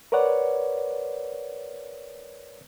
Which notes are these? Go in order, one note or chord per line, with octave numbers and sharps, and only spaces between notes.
A#4 B4 C#5 D5 F#5